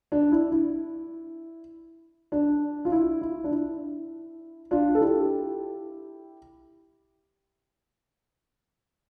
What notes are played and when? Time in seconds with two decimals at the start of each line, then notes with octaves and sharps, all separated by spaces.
0.12 D4
0.32 E4
0.52 E4
2.32 D4
2.85 F4
2.92 E4
3.22 E4
3.44 D4
3.51 E4
4.71 D4 F4
4.95 A4
5.01 E4 G4